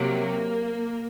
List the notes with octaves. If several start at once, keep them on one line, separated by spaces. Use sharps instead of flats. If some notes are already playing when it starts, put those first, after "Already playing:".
Already playing: C3 F#3 A#3